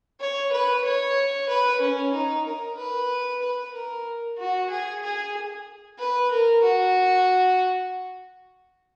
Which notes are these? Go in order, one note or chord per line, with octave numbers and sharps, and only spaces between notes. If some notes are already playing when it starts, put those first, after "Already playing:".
C#5
B4
C#5
B4
C#4
D#4
A#4
B4
B4
A#4
F#4
G#4
G#4
B4
A#4
F#4